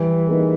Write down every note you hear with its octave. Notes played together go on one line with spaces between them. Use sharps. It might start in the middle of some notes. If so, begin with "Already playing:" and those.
Already playing: E3 G3
A#3 D#4 G#4 B4